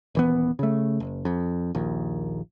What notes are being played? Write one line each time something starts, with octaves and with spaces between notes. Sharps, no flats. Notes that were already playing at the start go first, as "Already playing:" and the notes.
D#1 E3 B3
C#3 A3
F#1
F2
A#1 D#2